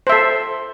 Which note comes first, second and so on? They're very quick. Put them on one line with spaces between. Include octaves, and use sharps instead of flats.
C5 E5 A4